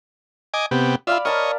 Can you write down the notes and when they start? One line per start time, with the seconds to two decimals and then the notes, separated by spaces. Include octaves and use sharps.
0.54 D#5 G#5 D6
0.71 C3 B3 G4
1.07 F4 D5 E5 F5 B5
1.25 A#4 C#5 D#5 A5 B5